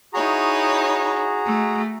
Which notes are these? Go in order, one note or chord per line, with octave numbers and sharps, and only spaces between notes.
D#4 E4 F#4 G#4 C#5 A#5
A3